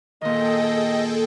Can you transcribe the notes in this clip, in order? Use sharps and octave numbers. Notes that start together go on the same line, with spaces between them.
A#2 D#3 G#4 A4 D#5 G5